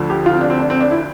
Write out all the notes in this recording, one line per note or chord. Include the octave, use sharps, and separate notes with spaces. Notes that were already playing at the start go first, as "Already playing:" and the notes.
Already playing: D2 D3 F3
G4
F4
C4
D4
C4
D4
C4
D4
E4